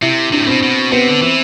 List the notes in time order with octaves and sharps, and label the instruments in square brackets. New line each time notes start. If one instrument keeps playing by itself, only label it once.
[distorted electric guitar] C3 [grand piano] E4
[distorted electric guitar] C3 [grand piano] D4
[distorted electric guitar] A2
[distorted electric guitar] B2 [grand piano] C4
[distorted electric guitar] B2
[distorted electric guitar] C3 [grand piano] B3
[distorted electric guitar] D3
[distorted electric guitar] E3 [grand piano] C4